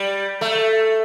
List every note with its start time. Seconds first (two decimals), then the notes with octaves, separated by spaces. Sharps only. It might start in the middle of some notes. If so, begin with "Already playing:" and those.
Already playing: G3
0.41 A3